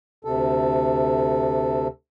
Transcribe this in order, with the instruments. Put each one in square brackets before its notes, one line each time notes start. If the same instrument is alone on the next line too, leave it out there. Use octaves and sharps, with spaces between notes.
[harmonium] D2 C3 A4